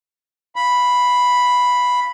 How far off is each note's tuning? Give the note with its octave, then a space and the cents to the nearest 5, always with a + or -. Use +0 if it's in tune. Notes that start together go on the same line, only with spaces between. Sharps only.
F5 +0 B5 +0